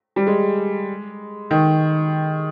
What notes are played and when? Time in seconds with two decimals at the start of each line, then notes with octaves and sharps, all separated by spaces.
0.16 G3
0.27 G#3
1.51 D#3